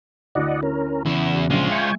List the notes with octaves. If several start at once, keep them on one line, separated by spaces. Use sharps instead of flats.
D2 E4 D5 D#5 F#5
C#4 A#4
E2 C#3 E4
F#4
A#1 F3 G#3 F4
E5 G5 G#5 C#6